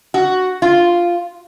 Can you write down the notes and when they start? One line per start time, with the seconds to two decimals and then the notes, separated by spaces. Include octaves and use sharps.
0.14 F#4
0.62 F4